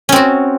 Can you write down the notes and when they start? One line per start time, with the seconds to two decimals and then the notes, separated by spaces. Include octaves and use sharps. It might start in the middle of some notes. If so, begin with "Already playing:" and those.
0.09 C#4
0.12 C4
0.16 F#4